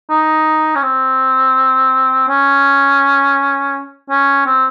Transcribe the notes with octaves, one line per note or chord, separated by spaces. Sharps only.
D#4
C#4
C4
C#4
C#4
C4